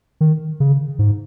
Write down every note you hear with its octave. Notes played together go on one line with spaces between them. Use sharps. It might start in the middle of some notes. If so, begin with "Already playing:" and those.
D#3
C#3
G#2